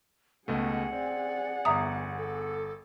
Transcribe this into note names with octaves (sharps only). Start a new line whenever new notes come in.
C#2 B2 A3 G#4 D#5 F#5
C4 D5
G1 E2 E5 A#5 D#6
A4